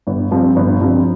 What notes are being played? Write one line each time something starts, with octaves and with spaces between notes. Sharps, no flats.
G1
G2 F3 C4
G1
G2 F3 C4